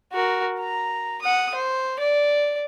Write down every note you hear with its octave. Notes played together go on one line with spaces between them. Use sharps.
F#4 A#4
A#5
F#5 D#6
C5
D5